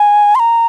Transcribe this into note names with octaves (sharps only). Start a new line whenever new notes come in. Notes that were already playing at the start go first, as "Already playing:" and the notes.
Already playing: G#5
C6
A#5